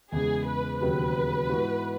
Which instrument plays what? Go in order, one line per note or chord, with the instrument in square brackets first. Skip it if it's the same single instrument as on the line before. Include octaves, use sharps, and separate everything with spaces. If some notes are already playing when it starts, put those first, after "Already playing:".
[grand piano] E2 C#3 G#3 [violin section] G#4
[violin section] B4
[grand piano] E1 D#2 C#3 F#3 [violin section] B4
[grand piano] G#2 E3 B3 F#4